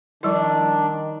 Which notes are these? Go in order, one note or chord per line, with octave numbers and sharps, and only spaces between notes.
D#3 F3 G3 D4 E4